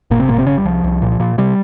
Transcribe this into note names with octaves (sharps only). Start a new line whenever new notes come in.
G1 A#2 A#3
C3 C4
G1 A#2 A#3
C3 C4
G1 C#3 C#4
G3
C2 F3
C2
A#2
A#2
C3 G3